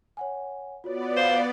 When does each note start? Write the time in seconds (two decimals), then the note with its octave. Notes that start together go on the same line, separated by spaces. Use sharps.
0.17 C#5 F#5 G#5
0.84 B3 F4 F#4 C#5 D5
1.17 C5 F5